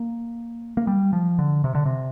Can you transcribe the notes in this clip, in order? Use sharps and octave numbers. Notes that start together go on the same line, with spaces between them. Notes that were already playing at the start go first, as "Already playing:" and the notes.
Already playing: A#3
A#3
G3
F3
D3
C3
D3
C3